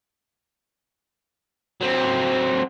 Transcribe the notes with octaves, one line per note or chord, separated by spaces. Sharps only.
F#3 C4